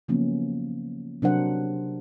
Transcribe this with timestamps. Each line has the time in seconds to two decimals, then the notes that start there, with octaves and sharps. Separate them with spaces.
0.08 C#3 F3 F#3 A#3 B3 C#4
1.22 C3 F#3 D4 A#4 C5 F#5